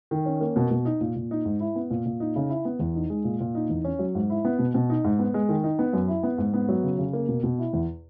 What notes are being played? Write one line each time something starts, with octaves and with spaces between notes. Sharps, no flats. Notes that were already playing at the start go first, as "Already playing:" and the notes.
D#3
C#4
A#3
B2
B2
D#4
A#2
A#2
D#4
G#2
E4
B3
A#2
A#2
D#4
C#3
E4
B3
E2
D#4
G#3
A#2
A#2
D#4
E2
C#4
F#3
G#2
E4
B3
B2
B2
D#4
G#2
B3
G#3
D#3
D#4
B3
F#2
E4
B3
G#2
B3
F#3
C#3
C#3
A#3
B2
B2
E4
E2